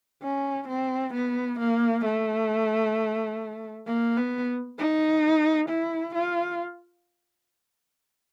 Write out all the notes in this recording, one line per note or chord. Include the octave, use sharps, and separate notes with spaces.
C#4
C4
B3
A#3
A3
A#3
B3
D#4
E4
F4